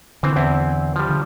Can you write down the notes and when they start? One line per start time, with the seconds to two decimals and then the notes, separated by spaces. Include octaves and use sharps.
0.23 D3 E3 C4
0.36 E2 C4 E4
0.96 F3 G3
1.09 D3